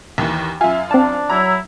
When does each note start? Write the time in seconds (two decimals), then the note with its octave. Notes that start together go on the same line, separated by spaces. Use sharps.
0.18 D#2 D#3 E3
0.61 F#2 F4 E5 G#5
0.91 C4 D4 A5
1.29 F#3 E4 A#5